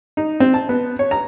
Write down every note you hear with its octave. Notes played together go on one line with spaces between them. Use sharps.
D#4
C4
A5
B3
C#5
A#5